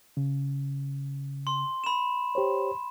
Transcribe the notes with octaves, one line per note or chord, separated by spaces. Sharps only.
C#3
C6
B5 E7
G4 C5 C#5